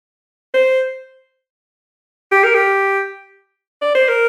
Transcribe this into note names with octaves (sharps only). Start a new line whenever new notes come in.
C5
G4
A#4
G4
D5
C5
A#4